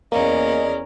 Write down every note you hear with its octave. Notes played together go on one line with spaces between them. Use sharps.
E2 A#3 C#4 G#4 A#4 D5 D#5